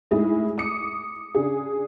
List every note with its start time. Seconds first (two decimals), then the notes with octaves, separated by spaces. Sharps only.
0.11 A2 G#3 D#4 E4 G#4
0.58 D6 D#6 C#7
1.35 C#3 D4 G#4